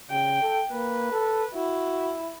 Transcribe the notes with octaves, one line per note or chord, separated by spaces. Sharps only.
C#3 G5
A4
A#3 B4
A4
E4 F#4